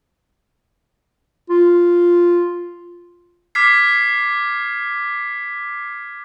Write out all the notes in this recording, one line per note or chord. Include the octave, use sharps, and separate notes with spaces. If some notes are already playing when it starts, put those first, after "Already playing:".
F4
D6 F6 G#6 B6 C7